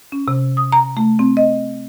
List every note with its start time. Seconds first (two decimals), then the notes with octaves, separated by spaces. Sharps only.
0.12 C#4
0.28 C3
0.57 D#6
0.72 A#5
0.97 A3
1.19 C4
1.37 D#5